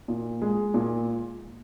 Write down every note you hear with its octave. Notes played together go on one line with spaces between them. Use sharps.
A#2
G#3
A#2